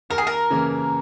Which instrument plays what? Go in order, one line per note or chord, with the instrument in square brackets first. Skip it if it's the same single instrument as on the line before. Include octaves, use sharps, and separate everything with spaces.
[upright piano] D#2 [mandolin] A#4
[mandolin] G#4
A#4
[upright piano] C#3 E3 A#3